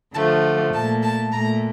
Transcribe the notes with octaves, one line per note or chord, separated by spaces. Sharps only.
D3 F3 A3 A5
A#2 A3 A5
A5
A#2 A3 A#5